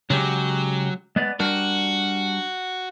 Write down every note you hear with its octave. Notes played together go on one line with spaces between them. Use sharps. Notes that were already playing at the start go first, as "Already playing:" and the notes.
C#3 F#3 G#3 G4
G#3 B3 D5
G3 D4 F#4 A#4